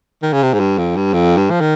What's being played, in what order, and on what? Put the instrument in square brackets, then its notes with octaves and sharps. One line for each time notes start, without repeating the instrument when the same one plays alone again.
[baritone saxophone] D#3
C#3
C3
G#2
G2
F2
G2
F2
G2
F3
D#3